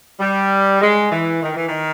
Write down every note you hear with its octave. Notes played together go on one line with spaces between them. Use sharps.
G3
G#3
E3
D#3
E3
D#3